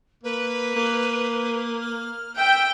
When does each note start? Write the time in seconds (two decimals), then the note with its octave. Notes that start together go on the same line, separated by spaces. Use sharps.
0.23 A#3 B4
0.76 A#3
1.81 F6
2.36 E5 G5